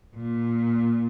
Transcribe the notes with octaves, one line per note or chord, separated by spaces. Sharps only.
A#2